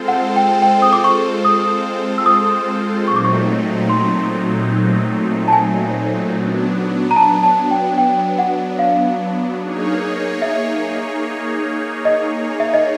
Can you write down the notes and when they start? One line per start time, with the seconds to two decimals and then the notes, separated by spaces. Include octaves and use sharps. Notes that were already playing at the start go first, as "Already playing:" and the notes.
Already playing: G#3 C4 F4 A4 C5
0.08 F#5
0.36 G5
0.62 G5
0.82 D#6
0.93 D6
1.04 C#6
1.45 D#6
2.18 E6
2.26 D#6
3.08 A#2 F#3 A3 C4 D#4 C#6
3.16 D6
3.25 C#6
3.89 C6
5.48 A5
5.53 G#5
6.34 F#3 B3 D4
7.11 A#5
7.16 A5
7.43 A5
7.71 G5
7.98 G5
8.39 F#5
8.79 F5
9.61 A#3 D#4 G#4 C#5
10.42 E5
12.05 D#5
12.60 E5
12.74 D#5